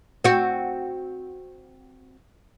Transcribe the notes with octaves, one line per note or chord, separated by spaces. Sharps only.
C4 F#4